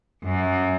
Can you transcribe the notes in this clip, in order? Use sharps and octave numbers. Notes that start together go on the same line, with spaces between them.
F#2